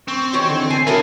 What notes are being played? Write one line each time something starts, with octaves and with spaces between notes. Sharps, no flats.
C4 C#6
E2 D#3 E3 C#5
D3
A4 G#5 C7
D3 F#3 E4 F#4 A#4 D#5